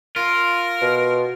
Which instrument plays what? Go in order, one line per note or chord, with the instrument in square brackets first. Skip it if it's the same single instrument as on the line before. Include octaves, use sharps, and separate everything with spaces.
[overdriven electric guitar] F4 [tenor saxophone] A#4
[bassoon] B2